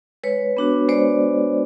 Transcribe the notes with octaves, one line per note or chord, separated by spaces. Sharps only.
G#3 B4 C#5
B3 D4 F#4
G#3 C5 D5